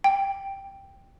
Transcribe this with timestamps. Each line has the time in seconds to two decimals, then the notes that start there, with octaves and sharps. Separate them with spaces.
0.04 G5